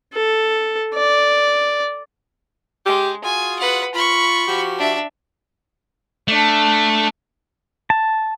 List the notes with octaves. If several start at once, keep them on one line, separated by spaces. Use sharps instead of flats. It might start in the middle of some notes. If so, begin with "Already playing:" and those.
A4
D5
G#3 G4
F4 F#4 G#4 G#5
B4 F#5
F4 B5 C#6
F3 F#4 G4
D4 E5
A3 D4
A5